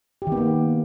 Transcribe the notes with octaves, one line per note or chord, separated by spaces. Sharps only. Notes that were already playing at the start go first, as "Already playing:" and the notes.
G4
D#3
B3
A#3